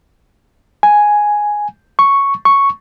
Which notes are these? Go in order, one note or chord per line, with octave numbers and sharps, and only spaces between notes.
G#5
C#6
C#6